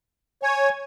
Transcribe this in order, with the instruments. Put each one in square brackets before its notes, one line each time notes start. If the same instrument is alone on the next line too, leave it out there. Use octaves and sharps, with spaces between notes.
[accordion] C#5 [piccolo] G#5